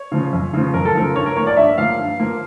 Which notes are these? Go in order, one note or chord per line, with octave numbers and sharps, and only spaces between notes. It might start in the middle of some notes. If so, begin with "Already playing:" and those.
Already playing: C#5
C#3 F3
F2
C#3 F3
F2 A#4
A4
C#3 F3 A#4
G2 C#5
A#4
F3 A#3 C#5
D5
G2 E5
F3 A#3 F5
G2
F3 A#3